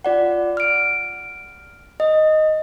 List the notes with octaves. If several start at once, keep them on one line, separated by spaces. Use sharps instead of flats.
F4 D5 F#5
F6 D7
D#5